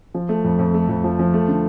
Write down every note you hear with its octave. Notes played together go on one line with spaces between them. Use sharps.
F3
A3
F2
F2
A3
F2
F3
F3
A3
D3